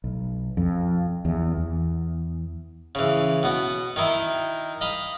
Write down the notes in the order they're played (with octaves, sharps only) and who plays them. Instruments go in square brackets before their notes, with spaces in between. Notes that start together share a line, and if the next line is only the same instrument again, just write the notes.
[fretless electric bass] B1
F2
E2
E2
[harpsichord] C#3 E3
B2 B3
D#3 D#4 E4
D#5 F5 B5